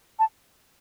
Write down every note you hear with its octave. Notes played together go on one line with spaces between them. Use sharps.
A5